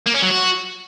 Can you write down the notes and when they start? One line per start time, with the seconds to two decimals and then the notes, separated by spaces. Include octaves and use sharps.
0.06 A#3
0.14 C#4
0.22 F#3
0.30 F#4